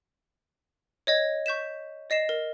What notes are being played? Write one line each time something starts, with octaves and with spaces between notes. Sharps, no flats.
C#5 D#5 G#6
C#6 G6 B6 E7
D5 D#5 C7 E7
A#4